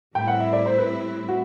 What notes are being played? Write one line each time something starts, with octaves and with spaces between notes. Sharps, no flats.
A2 G3 C4 E4 G5
F#5
E5
D5
C5
B4
F#4